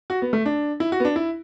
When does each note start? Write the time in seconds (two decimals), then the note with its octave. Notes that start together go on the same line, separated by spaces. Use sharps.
0.10 F#4
0.22 B3
0.33 A3
0.46 D4
0.80 E4
0.92 F#4
1.00 B3
1.05 D4
1.16 E4